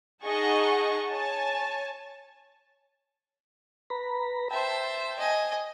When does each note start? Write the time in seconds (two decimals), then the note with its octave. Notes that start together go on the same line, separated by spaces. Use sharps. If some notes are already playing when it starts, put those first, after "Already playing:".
0.25 D#4 G#4 D#5 F#5 A5 C#6
1.09 C#5 G#5 A5
3.90 B4 A#5 B5
4.51 C5 E5 G5 A5
5.19 D#5 G#5